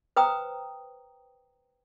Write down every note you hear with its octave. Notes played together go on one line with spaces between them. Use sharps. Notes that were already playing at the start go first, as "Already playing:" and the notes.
B4 C5 G5 A#5 D#6